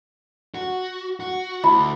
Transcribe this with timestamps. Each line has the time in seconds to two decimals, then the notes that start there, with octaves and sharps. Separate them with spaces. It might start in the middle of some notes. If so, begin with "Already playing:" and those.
0.55 F#4
1.20 F#4
1.64 D2 E4 B5